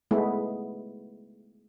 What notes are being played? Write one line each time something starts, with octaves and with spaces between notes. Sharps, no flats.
G#3 A3 B3 E4